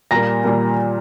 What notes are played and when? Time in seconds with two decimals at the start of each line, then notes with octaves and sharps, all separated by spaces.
0.11 A#2 G3 A#3 A#5 A#6
0.44 A#2 G3 A#3